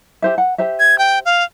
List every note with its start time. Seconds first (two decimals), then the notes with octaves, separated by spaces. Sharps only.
0.22 G4 C5 E5
0.38 F#5
0.58 G4 C5 E5
0.80 G#6
0.99 G5
1.25 F5